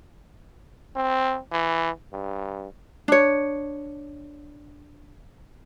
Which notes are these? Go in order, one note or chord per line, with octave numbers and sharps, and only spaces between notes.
C4
E3
G2
D4 C#5